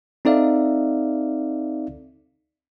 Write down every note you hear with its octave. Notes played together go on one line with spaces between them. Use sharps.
C4 D#4 A4 D5 E5 F5